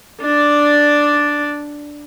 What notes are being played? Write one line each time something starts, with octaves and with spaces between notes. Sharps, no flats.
D4 D5